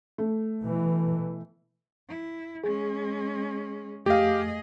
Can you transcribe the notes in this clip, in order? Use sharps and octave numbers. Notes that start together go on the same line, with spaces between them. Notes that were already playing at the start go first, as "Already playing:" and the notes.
A3
B2 E3
E4
G#3 C#4 G#4
F2 A3 G4 G#4 D#5 F5